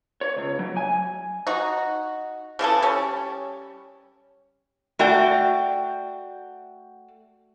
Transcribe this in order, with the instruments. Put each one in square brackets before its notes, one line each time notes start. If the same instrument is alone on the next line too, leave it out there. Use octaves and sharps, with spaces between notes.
[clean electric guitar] C#5
C#2
F#3
G#5
[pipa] D#4 F#4
C#3 E3 G#4 A4
G3 C#4
[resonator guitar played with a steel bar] A3 F#4 D5 G5